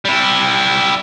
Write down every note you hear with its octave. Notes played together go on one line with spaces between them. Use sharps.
G3 E4